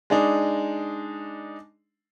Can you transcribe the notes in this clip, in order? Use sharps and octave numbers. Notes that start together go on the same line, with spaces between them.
G#3 D4 D#4